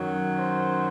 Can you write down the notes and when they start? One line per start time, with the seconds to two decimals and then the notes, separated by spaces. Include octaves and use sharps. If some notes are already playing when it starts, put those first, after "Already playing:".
Already playing: F#2 D#3 F#3
0.38 C5